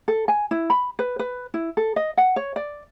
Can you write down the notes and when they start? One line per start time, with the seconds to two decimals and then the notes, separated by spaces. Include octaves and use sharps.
0.08 A4
0.28 G#5
0.51 E4
0.70 B5
0.99 B4
1.19 B4
1.54 E4
1.77 A4
1.96 D#5
2.17 F#5
2.36 C#5
2.56 D5